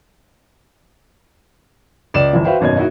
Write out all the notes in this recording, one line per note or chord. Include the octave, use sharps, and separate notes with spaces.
C#2 D5 E7
G1 E3 F3
F#4 B4 C5 E5 F5 G5
G#1 F#2 B2 D#5 G#6
A#3 D#4 E4 F#4